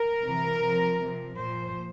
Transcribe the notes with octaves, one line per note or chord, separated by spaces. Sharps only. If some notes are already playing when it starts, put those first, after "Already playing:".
Already playing: A#4
C3 E3
C3 F3
C3 F3
A#2 F3 C5